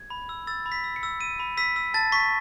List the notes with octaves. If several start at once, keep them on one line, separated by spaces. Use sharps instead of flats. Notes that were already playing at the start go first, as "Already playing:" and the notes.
Already playing: G#6
B5
E6
E6 A6
B5
B6
E6
C#7
E6
E6 D#7
B5
E6 B6
E6
A5 A6
C#6 B6